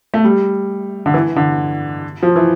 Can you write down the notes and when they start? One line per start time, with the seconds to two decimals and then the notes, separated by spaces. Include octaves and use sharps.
0.14 A3
0.24 G3
1.06 D3
1.14 E3
1.36 D3
2.23 F3
2.36 E3